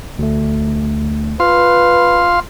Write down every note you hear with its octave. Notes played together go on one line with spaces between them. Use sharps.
D2 A3
F4 B4 F5 C6